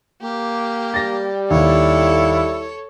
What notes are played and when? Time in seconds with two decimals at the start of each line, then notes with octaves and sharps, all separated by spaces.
0.23 A#3 G4
0.94 G3 A6 A#6
1.50 D#2 E4 A4 C#5